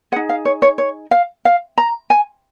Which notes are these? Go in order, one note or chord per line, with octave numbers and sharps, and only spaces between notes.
D#4 G#4 F#5
F5
C#5
C#5
C#5
F5
F5
A#5
G#5